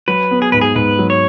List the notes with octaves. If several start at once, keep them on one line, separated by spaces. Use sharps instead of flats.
F#3 B4
B3
G#4
G#2 B4
G#4
G#2 B4
F#3
C#5